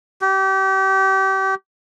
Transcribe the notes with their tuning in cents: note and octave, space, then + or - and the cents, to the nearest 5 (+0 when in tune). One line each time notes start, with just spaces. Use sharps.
G4 -30